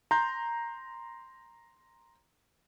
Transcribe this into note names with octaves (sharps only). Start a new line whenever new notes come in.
A#5 C6 G6